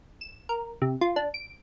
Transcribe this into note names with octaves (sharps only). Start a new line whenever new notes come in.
E7
A#4
C3
F4
D4
D7